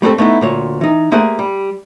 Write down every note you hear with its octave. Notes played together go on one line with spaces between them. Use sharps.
G3 A3 B3 C4 A4
A3 B3 D#4 E4
D2 A#2 C#5
E3 D#4
G3 A3 A#3 G#4 C5 F#5
G3